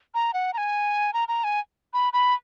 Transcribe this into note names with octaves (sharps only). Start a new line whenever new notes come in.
A#5
F#5
A#5
G#5
A#5
A#5
G#5
B5
B5